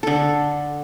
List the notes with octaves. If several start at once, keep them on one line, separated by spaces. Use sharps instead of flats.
D3 A4